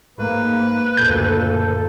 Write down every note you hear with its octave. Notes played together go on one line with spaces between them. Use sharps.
G#2 A#3 B4
F#1 D2 A#2 A4 G6